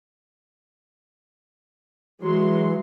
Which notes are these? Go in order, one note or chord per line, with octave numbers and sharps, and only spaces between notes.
E3 F#3 G#3 C6